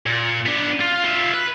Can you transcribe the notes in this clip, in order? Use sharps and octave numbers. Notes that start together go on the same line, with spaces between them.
A#2
B3 D4
F4
F4 E5
B4